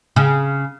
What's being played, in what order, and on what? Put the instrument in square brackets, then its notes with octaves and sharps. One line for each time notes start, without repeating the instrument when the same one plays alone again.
[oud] C#3